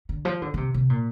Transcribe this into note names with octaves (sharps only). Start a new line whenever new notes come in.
D3
F3
D3
D3
C3
C3
A#2